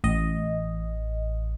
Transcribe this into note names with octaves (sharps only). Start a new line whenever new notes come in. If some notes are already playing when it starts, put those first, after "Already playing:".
A1 D#5